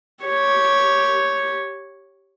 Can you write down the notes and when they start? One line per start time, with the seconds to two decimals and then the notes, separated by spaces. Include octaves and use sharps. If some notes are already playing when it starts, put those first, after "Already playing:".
0.24 G4 C#5